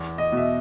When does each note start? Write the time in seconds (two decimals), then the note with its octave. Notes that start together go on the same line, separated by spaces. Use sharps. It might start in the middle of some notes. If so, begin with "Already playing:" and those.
Already playing: E2
0.18 D#5
0.32 B2 E5